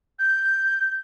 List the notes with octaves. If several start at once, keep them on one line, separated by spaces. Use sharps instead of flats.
G6